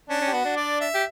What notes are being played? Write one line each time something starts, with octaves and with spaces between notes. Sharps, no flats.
C#4 D4
C#4
G4
B3 F#4
D4
D5
E5
G4